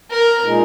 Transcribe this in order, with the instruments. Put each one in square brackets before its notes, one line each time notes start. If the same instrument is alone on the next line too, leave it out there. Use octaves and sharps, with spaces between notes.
[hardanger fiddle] A#4
[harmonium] A#2 G#3 D#4 G#4